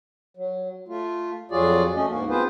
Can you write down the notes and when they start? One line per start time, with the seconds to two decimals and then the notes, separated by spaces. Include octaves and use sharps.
0.37 F#3
0.88 A3 F4
1.51 F2 F#3 F4 F#4 G#4 D5
1.95 A3 C#4 D#5
2.10 D2 G#2 A#3 F#4
2.30 B3 C4 F4 G#4 B4 C5